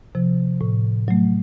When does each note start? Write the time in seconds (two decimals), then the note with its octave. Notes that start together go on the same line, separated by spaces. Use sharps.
0.15 C3 F3
0.61 A2
1.08 F#3 A3